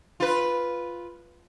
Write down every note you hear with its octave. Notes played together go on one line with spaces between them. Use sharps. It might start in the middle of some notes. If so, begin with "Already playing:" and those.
F4 B4